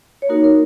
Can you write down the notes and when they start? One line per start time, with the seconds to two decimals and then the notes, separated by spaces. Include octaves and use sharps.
0.22 C#5
0.29 A#3 D#4 F#4 A#4
0.44 A#4